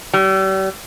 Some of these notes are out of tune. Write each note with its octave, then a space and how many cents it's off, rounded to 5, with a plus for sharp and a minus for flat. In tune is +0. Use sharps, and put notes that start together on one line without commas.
G3 -40